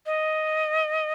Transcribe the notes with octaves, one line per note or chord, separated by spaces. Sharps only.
D#5